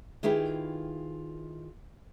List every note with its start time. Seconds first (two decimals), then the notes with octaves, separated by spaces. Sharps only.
0.23 D#3 E4 F4 G4 G#4 B4